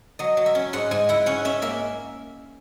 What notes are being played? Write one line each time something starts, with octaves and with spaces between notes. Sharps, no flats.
F#3 D#5
F#3
E5
C#4
G#2 F#5
G#2 G#5
E4 F#5
C#4 F#5
C#4 E5
A#3 E5